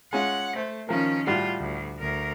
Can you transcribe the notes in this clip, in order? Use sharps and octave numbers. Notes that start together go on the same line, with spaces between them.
G#3 C#4 F4 F#5
A3 C5
D#3 F3 C#4 A#4
A2 G3 F4 F#4
D2
D2 A#4